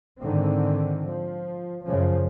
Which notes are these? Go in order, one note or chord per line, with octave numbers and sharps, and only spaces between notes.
G#2 D3 D#3 C4
F3
F#2 C#3 F3